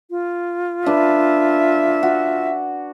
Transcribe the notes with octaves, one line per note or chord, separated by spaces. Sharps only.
F4
D4 B4 E5
F#4